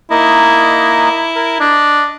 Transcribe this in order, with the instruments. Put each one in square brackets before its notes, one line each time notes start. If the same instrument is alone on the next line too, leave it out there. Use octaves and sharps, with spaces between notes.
[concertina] A#3 D#4 D#5 [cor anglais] E4
[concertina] A#4
[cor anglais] D4 [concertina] D#5